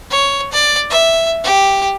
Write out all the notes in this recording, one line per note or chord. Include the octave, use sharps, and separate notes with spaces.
C#5
D5
E5
G4